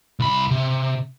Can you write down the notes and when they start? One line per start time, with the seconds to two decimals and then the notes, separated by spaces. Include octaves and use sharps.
0.20 C2 B5
0.51 C3